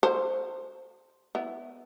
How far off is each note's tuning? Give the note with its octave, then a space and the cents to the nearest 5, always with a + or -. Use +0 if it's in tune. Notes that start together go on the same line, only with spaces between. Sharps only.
A4 +45 C5 +0
B3 +10 E4 +0